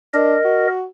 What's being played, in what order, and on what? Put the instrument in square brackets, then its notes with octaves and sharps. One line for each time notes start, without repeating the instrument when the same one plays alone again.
[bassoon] D4 [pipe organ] A#4 D#5
[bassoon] F#4